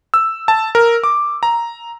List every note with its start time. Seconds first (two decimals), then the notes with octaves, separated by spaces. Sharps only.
0.14 E6
0.48 A5
0.75 A#4
1.04 D6
1.43 A#5